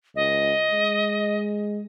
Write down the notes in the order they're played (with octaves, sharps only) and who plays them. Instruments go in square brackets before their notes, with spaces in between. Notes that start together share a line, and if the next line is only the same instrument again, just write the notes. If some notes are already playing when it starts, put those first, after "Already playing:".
[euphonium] C#2 [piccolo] D#5
[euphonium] G#3